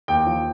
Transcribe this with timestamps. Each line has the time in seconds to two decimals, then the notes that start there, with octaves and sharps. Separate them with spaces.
0.08 D#2 G5
0.26 F3